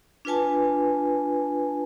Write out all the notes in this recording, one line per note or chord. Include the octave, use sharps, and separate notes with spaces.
D4 F4 B4 G#5 A5